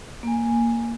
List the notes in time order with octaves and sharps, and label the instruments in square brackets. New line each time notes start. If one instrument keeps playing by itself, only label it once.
[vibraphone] A#3 G#5